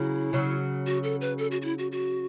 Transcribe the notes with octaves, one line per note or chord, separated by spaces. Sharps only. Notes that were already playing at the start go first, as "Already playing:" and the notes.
Already playing: C#3 F#3 E4
C#3 F#3
F#4
A4
B4
A4
F#4
F#4
E4
F#4
F#4